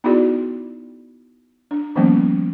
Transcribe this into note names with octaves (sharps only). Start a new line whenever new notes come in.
B3 D#4 E4 F#4 G#4 D5
D4
D#3 F3 G3 A#3 B3 C#4